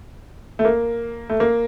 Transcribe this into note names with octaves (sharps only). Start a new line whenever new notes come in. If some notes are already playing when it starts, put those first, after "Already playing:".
A3
A#3
A3
A#3